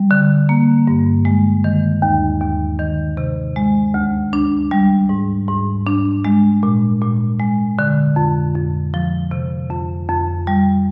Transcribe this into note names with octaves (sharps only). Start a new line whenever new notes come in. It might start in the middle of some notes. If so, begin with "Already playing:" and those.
Already playing: G3
D3
A#3
G2
G#3
D#3
D#2
D#2
D#3
C3
G#3
D2
D4
G3
G#2
G#2
D4
G#3
A#2
A#2
G#3
D3
F2
F2
F3
C3
F2
F2
G3